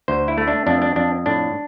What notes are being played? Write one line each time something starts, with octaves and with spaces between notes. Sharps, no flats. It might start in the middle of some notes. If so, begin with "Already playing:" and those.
D2 C5
E4
A3
D4
F2 D4
D4
F2 D4
A2 D4